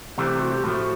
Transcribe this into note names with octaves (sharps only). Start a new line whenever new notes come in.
C2 C3 E3 A3 C4 G4
F#4
G4
A2 F3 A3 F#4